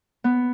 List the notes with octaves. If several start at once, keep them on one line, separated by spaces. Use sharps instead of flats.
B3